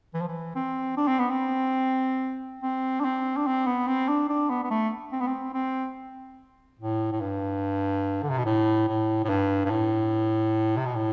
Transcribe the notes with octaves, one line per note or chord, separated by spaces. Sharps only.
E3
F3
E3
C4
D4
C4
B3
C4
C4
D4
C4
D4
C4
B3
C4
D4
D4
B3
B3
A3
C4
B3
C4
C4
A2
A2
G2
D3
C3
B2
A2
A2
A2
G2
G2
A2
C3
B2
A2